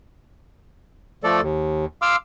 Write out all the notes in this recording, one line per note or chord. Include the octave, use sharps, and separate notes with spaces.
F3 A3 A4 D5
D#2
F5 C6 D6 E6 F6